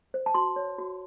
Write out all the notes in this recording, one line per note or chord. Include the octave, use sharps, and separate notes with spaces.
C5
A5
F#4 C6
C#5
F#4